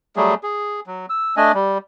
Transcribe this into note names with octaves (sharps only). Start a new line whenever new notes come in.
F#3 G3 A3 G#4
G#4
F#3
E6
A3 D4 D#5 G#5
G3